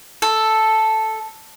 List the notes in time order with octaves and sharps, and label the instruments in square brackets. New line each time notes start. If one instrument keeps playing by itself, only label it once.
[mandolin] A4